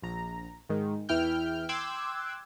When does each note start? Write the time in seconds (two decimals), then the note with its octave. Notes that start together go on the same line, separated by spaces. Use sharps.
0.02 A#1 A#5
0.69 G#2 D#3 G#3
1.09 E2 E3 E4 G5 F6 G6
1.69 G5 C6 D6 E6 F#6 G#6